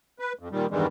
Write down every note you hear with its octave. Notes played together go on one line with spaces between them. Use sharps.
B4
F2
A#2 D#3 G3
E2 G2 D#3 E3 G3 G#3